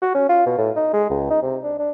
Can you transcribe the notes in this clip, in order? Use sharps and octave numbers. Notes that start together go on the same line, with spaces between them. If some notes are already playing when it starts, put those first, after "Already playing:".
F#4
C#4
F4
B2
A2
D#4
G#3
C#2
D#4
C3
D4
D4